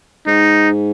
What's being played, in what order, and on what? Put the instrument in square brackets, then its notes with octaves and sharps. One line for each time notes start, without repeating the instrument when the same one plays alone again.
[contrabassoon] G#2 [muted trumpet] D#4